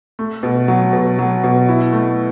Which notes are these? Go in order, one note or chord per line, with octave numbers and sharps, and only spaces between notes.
A3
B2
F#3
B2
F#3
B2
E4
A3